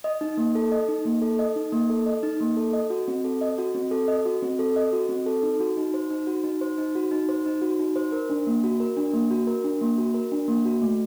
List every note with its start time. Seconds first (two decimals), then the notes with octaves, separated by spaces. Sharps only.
0.04 D#5
0.21 D#4
0.37 A#3
0.55 A4
0.72 D#5
0.88 D#4
1.05 A#3
1.22 A4
1.39 D#5
1.56 D#4
1.72 A#3
1.90 A4
2.06 D#5
2.23 D#4
2.40 A#3
2.57 A4
2.73 D#5
2.90 F#4
3.08 C4
3.24 A4
3.41 D#5
3.58 F#4
3.75 C4
3.91 A4
4.08 D#5
4.25 F#4
4.42 C4
4.59 A4
4.76 D#5
4.93 F#4
5.09 C4
5.26 A4
5.43 D#4
5.60 F#4
5.77 D#4
5.94 C5
6.11 D#4
6.27 F#4
6.44 D#4
6.61 C5
6.78 D#4
6.95 F#4
7.11 D#4
7.29 C5
7.46 D#4
7.61 F#4
7.80 D#4
7.96 C5
8.12 A#4
8.30 D4
8.47 A#3
8.64 F#4
8.80 A#4
8.97 D4
9.13 A#3
9.31 F#4
9.47 A#4
9.64 D4
9.81 A#3
9.98 F#4
10.14 A#4
10.32 D4
10.48 A#3
10.65 F#4
10.82 A3